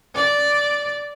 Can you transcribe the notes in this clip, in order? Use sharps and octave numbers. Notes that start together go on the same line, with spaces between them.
D5